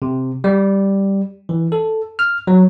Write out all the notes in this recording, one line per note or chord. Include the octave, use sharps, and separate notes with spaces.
C3
G3
E3
A4
F6
F#3